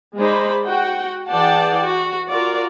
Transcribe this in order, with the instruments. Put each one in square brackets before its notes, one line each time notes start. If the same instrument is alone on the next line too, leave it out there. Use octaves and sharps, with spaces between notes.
[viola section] G#3 D#4 C5 D5 B5
F#4 F#5 G5
E3 G#4 D5 F#5 G5 A5
F#4
F4 F#4 A#4 D5